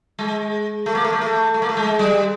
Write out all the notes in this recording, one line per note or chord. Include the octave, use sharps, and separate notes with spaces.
G#3
A3
A#3
A3
A#3
A3
A3
A#3
A3
G#3
G3